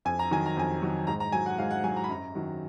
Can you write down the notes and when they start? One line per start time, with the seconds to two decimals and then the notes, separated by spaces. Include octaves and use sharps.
0.05 F2 G#5
0.19 A#5
0.31 D#3 F#3 G#5
0.46 A#5
0.57 F2 G#5
0.82 D#3 F#3
1.07 G#2 A#5
1.20 A#5
1.32 F#3 G#5
1.46 F#5
1.58 G#2 F5
1.71 F#5
1.84 F#3 G#5
1.96 A#5
2.04 B5
2.09 F#2 A#5
2.35 D#3 F#3